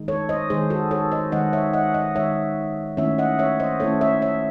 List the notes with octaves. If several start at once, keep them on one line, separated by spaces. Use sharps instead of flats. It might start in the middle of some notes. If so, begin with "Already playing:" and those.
Already playing: D#3 G#3 D#4
A4 C#5
C5 D#5
D#3 G#3 D#4 G#4 C5
F#4 A4
A4 C#5
C5 D#5
D#3 G#3 D#4 D#5 F#5
C#5 E5
D#5 F#5
D#5 F#5
D#3 G#3 D#4 C#5 E5
D#3 A3 C#4 E4 C#5 E5
D#5 F#5
C#5 E5
C5 D#5
D#3 A3 C#4 E4 A4 C#5
C#5 E5
C#5 E5